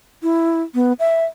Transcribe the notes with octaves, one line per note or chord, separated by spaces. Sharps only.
E4
B3
E5